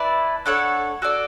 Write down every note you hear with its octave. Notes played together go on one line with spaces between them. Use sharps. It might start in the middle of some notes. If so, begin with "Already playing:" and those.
Already playing: E4 B4 D5 A5
D4 A4 C#5 F#5
F#4 A4 D5